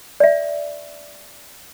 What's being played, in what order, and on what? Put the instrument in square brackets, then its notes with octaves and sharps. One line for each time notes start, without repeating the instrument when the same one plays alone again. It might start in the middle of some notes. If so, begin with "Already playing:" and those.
[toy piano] D5 E5